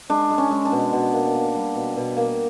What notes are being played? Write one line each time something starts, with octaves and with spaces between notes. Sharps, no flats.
G#3 D4
G#3
C#4
G#3
D4
B2
B2
A#3
A#3
G3
B2
B2
A#3